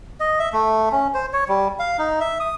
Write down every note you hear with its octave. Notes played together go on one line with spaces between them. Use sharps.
D#5
E5
A3
C#4
C5
C#5
G3
F5
D#4
E5
D#6